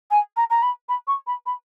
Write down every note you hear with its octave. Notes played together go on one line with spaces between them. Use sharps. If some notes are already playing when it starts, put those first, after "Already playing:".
G#5
A#5
A#5
B5
B5
C#6
B5
B5